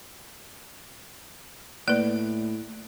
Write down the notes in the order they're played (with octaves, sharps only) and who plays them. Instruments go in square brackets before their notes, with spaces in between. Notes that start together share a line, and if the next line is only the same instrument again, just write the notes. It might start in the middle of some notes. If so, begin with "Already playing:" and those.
[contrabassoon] A2 [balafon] A#3 B4 [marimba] D5